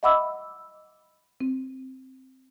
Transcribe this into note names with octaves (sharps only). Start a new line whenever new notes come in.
D#5 E5 F#5 B5 D6 E6
C4